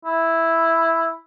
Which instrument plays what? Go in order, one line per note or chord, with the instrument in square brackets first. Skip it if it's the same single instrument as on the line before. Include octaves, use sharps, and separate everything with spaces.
[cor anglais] E4